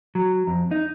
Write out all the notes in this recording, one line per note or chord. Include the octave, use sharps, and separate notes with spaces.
F#3
F2
D#4